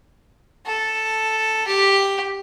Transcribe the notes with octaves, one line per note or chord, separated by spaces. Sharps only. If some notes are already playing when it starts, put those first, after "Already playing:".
A4
G4